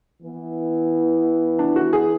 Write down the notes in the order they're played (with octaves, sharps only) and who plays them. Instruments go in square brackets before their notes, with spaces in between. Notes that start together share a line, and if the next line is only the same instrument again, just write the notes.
[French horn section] E3 B3 E4
[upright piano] D4
F#4
G#4